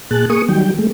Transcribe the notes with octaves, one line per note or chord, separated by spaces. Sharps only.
A#2 G#4 A5 F#6
A#3 G#4 C#6 D#6
D#3 F#3 G3 G5
G#3 A3